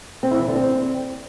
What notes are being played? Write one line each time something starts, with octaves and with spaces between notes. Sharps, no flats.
C4
E4
E3
D3
C4